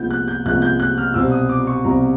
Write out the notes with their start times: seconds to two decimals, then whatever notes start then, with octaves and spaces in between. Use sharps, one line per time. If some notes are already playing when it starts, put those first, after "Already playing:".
Already playing: C2 A#2 F3 G#3 B3 G6
0.11 F#6
0.28 G6
0.45 C2 A#2 F3 G#3 B3 F#6
0.62 G6
0.80 F#6
0.98 F6
1.14 C2 B2 G3 C4 E6
1.32 D#6
1.49 D6
1.67 C#6
1.84 C2 B2 G3 C4 A#5